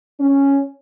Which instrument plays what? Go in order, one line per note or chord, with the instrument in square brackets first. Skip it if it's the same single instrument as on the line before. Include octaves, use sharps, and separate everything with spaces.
[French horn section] C#4